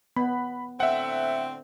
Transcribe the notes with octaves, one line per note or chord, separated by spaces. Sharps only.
B3 B5
A2 D3 C4 E5 F#5